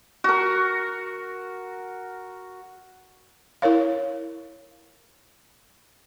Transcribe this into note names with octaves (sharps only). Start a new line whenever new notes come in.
F#4 A#4
E4 A#4 C#5 F5